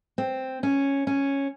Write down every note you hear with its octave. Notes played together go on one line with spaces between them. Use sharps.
C4
C#4
C#4